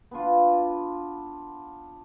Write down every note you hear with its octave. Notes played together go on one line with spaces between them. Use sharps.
B3 D4 F4